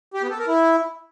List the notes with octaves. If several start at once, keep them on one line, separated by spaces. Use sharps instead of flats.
G4
B3
A4
A#4
E4